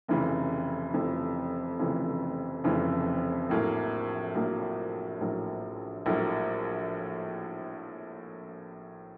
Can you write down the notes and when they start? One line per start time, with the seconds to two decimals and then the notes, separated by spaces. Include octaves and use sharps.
0.08 F1 F2 C#3 E3
0.94 F1 F2 C#3 E3
1.79 F1 F2 C#3 E3
2.64 F1 F2 C#3 E3
3.49 A#1 A2 F#3 A#3
4.35 A#1 A2 F#3 A#3
5.21 A#1 A2 F#3 A#3
6.06 A#1 A2 F#3 A#3